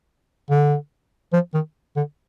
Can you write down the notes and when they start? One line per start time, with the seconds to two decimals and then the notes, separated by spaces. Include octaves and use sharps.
0.50 D3
1.33 F3
1.54 D#3
1.96 D3